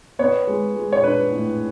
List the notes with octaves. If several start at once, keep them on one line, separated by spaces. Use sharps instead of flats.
B3 C#5
G#3
G#3
C#5
D4 B4
A2